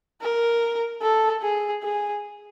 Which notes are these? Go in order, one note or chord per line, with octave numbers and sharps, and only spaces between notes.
A#4
A4
G#4
G#4